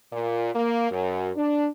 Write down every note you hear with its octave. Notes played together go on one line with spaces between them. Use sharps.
A#2
A#3
F#2
D4